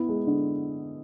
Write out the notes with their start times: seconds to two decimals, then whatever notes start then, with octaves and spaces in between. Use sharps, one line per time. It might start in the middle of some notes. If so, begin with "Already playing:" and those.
Already playing: B3 E4
0.09 G#3
0.27 D3